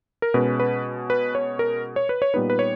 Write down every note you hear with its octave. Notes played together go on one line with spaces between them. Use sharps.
A#4
B2 G#3 C#4 B4
B4
B4
C#5
A#4
C#5
B4
C#5
A#2 G3 B3 D#4 B4
B4
C#5